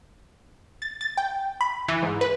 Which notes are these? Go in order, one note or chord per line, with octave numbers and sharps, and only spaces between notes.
A6
A6
G5
B5
E3
G#2
B4